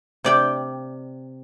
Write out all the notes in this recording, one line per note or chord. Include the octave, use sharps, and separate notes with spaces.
C3 D5 G5